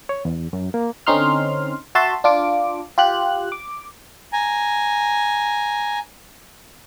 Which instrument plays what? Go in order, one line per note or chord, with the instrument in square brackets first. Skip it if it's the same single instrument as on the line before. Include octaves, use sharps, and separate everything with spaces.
[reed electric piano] C#5
E2
F#2
A#3
[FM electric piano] D3 C4 C#4 D#4 C6 F6
F#4 E5 A5 C6
D4 F4 D6
F4 G4 F#6
D6
[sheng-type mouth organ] G#5 A#5